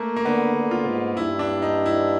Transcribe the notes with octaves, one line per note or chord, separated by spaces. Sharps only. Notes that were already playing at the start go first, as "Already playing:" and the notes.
Already playing: A3 A#3
A#3
D3 B3
D3
F4
G#2
G2 E4
D4
D#4
E4